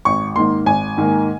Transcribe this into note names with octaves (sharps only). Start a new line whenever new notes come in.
G#1 C#6
G#2 D#3 A#3 C6
G#1 G#5
G#2 D#3 A#3